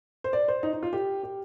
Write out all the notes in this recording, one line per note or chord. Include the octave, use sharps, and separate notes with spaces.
C5
D5
C5
D#4
D#4
F4
G4
G4